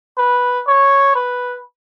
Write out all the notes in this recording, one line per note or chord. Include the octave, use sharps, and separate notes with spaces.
B4
C#5
B4